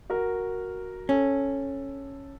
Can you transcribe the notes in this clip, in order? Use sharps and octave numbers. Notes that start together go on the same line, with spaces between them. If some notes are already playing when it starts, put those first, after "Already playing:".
F#4 A#4
C#4 A4